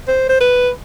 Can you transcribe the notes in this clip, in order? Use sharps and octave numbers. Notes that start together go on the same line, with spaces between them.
C5
C5
B4